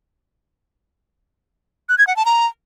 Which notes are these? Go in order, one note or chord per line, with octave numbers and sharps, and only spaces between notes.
F#6
G#6
F#5
A5
A#5